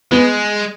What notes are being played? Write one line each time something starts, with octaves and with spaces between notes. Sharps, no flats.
G#3 B3